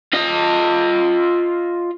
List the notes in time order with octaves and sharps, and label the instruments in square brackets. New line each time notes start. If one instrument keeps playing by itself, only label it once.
[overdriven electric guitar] F4 D#5